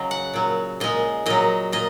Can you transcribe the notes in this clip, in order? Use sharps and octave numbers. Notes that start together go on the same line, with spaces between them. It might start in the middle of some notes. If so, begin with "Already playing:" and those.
Already playing: C#3 F#3 D#5
F#5
A#2 F#3
A#2 G#3 D#5
A#2 F#3 D#5
A#2 D#5